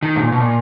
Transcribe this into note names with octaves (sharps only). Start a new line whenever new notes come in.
D#3
G#2
A#2
B2
A#2